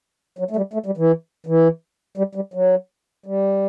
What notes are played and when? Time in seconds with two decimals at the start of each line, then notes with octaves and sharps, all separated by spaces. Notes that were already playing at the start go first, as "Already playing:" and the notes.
0.39 F#3
0.51 A3
0.56 G3
0.73 A3
0.86 G3
0.97 E3
1.46 E3
2.18 G3
2.35 G3
2.54 F#3
3.26 G3